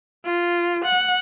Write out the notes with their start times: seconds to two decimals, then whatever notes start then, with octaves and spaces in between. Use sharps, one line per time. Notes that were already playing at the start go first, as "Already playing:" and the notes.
0.25 F4
0.85 F#5